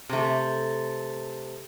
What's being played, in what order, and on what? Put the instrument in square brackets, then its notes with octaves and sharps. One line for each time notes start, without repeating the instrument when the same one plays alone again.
[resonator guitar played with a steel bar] C3 A3